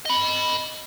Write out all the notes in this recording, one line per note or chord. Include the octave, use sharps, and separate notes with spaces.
D#5 B5